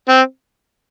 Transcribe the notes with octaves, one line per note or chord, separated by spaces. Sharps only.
C4